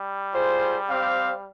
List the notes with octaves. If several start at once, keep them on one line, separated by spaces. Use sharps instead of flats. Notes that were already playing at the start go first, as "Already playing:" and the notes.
Already playing: G3
F4 G#4 C5
C4 G4 C5 F5